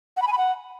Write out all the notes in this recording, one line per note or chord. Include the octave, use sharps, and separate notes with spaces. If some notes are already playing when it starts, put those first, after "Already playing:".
F#5
B5
G#5
B5
F#5